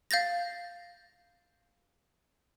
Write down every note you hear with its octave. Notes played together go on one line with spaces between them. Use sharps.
F5 G6 A6 A#6